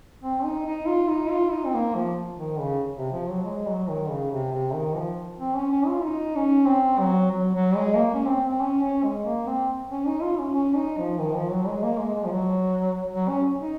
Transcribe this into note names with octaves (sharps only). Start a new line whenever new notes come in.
C4
D#4
D#4
F4
D#4
F4
D#4
C4
A#3
F3
D#3
C#3
C3
F3
F#3
G#3
F#3
D#3
C#3
C3
C3
D#3
F3
C4
C#4
C#4
F4
D#4
C#4
C4
F#3
F#3
F#3
G#3
A#3
C#4
C4
C4
C#4
C#4
G#3
A#3
C4
C#4
D#4
F4
C#4
C#4
D#4
F3
D#3
F3
F#3
G#3
A#3
G#3
G#3
F3
F#3
F#3
C#4
D#4